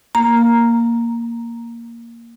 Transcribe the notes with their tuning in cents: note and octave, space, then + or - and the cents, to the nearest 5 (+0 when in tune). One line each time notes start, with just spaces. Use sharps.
A#3 +0 A#5 +0